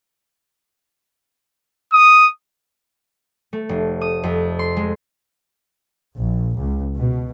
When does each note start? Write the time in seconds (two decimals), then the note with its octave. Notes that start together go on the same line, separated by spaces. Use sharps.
1.93 D#6
3.53 A3
3.69 F1
4.01 D#6
4.23 F2
4.59 C6
4.77 G#3
6.18 A#1
6.58 C#2
6.96 B2